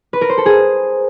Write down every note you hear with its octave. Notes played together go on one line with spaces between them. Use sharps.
B4
A#4
C5
A4
G#4